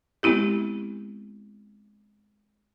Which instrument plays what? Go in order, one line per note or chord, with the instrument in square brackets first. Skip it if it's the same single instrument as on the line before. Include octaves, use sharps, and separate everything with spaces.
[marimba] G#3 B3 C4 E4 G4